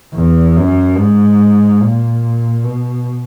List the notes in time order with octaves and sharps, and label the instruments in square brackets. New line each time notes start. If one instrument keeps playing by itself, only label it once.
[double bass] E2
F#2
G#2
A#2
B2